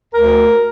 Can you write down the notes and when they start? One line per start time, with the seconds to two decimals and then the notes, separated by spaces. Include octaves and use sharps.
0.14 D2 A#4